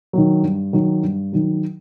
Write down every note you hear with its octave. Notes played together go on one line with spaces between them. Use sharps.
D#3 F#3
G2
D#3 F#3
G2
D#3 F#3